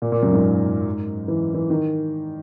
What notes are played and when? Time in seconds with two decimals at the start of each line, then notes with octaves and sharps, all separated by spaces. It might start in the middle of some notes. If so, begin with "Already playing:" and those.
0.02 A#2
0.12 A#2
0.23 F#2
0.33 G#2
1.28 E3
1.54 E3
1.70 D#3